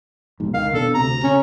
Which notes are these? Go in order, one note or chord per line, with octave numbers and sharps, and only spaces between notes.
B1 G#2
C#2 D#3 F5
B2 D4 A4
D2 C3 A#5
C#3 C#4